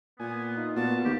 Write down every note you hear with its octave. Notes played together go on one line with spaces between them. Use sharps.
A#2 B3 G#5
D#4 F4
A#2 B3 F4 F#4 A5
D#2 G4